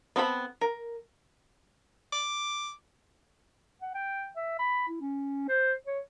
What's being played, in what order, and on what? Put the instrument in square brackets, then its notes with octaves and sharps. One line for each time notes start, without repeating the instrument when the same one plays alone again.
[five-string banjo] B3 C4 A4 C5 B5
A#4
[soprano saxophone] D6
[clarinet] F#5
G5
E5
B5
E4
C#4
C5
C#5